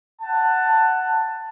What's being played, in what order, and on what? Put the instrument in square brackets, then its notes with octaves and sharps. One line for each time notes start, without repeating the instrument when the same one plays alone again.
[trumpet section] F#5 A5